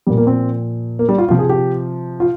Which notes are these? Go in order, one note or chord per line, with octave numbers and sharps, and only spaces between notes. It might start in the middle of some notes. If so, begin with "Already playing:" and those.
A#2 F3 G3
A#3
C4
A#3
G3
F4
C3 F3 F4
G#4
G4
F4